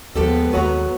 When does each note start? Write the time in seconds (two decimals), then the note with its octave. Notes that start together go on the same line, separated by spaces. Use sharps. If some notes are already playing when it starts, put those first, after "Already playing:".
0.15 D#2 F3 G#3 B3 G4 A4
0.53 D#2 F#3 B4 A#5